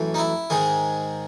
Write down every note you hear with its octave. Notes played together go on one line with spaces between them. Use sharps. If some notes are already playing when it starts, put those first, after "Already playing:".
Already playing: F#2 E3 A3
D#4
E4
G#2 D#3 G#3 G#4